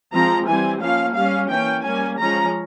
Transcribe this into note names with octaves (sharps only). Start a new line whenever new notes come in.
F3 G#3 C4 A#5
E3 G3 C4 G#5
F3 A#3 C#4 F5
G3 C#4 F5
E3 A#3 C#4 G5
G3 A#3 C#4 G#5
F3 G#3 C#4 A#5